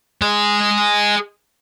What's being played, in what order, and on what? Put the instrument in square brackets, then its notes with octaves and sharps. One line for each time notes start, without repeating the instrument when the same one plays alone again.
[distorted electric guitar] G#4 D#5